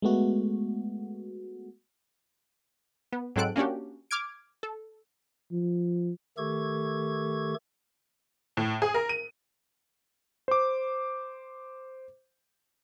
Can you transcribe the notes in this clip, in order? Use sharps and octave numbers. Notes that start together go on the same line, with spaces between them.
G#3 A3 B3 F#4
B3
G#2 F#3 C4 A4 F#6 D7
A#3 C#4 D4 F#4 G4
D6 F6 G#6 D7
A4
F3
D#3 A3 G4 A4 C#6 G#6
A2
G#4
A#4
D#7
C5 D6